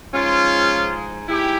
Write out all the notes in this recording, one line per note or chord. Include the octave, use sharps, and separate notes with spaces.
G#2 F3 G#3 C#4 F4
G#2 E4 G4